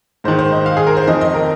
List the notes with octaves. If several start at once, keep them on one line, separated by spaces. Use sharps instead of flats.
G#2 D#3 C5
C5
D#5
F5
G#4
A#4
C5
F2 D#3 D#5
D#5
A#4